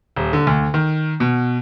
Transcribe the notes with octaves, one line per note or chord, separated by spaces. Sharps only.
D#1
D3
D2
D#3
B2